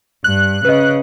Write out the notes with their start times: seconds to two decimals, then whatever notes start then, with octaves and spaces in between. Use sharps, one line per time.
0.24 G2 F#6
0.65 C#3 B4 D#5